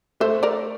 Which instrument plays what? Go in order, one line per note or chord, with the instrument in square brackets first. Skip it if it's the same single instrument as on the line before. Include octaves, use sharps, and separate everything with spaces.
[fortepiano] A3 [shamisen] C5 E5
[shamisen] A#4 D5